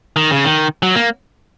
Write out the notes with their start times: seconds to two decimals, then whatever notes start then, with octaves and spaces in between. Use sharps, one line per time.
0.16 D#3
0.31 C#3
0.44 D#3
0.83 F#3
0.95 A#3